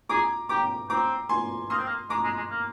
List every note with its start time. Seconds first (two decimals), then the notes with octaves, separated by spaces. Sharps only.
0.09 G#4 A#5 D6
0.49 G4 A#5 D6
0.90 C4 A#5 D6
1.29 G#5 C6
1.70 A#3 C6 D#6
1.78 C4
1.86 A#3
2.09 G#3 A#5 D6
2.24 G#3
2.37 G#3
2.50 A#3